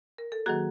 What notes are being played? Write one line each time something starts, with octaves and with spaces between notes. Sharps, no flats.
A#4
A4
D#3 F#3 A#3 F#4 G#4